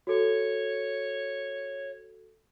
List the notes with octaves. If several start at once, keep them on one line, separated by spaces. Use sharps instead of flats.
F#4 A4 C#5